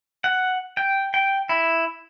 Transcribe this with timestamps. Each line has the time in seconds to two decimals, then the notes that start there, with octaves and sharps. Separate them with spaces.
0.24 F#5
0.77 G5
1.14 G5
1.49 E4